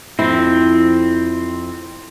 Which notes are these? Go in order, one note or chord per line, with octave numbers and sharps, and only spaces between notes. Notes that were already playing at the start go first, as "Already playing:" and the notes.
F2 C4 E4